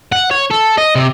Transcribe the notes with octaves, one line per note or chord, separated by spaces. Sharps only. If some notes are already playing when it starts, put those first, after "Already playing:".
F#5
C#5
A4
D#5
C3